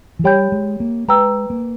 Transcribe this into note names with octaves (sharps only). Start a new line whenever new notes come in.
E3
G3 G4 C#5 G5 B5 G6
G#3
A#3
G#3 B4 G5 A#5 E6
A#3